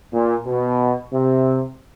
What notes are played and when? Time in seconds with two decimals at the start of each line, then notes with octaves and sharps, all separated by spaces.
0.12 A#2
0.46 B2
1.12 C3